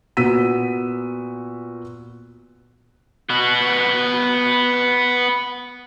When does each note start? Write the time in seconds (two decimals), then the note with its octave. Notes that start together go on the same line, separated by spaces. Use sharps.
0.17 A#2 B3 F#4 E6 B6 D#7
3.30 B3 F#4